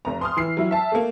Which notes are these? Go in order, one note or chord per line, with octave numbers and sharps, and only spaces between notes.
F1 A#5
C6 D#6 F6
E3 C7
F#3 E4
E5 A5
A3 A#3